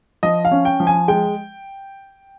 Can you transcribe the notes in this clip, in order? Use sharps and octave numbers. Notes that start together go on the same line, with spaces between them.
F3 D#5
F5
C#4
G5
F3
G#5
G#3 G5